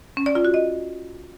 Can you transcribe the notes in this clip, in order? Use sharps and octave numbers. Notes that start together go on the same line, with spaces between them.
C#4
D5
F4
F#4
D#5